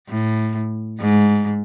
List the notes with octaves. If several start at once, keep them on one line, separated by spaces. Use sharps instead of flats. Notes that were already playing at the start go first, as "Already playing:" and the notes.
A2
G#2